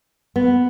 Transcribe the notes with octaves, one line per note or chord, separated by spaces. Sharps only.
B3